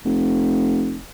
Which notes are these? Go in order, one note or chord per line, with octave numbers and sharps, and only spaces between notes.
F1